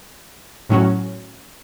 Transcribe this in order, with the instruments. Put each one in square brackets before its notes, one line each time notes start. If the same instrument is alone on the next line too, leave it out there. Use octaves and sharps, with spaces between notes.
[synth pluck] A2 F#3 C#4 F#4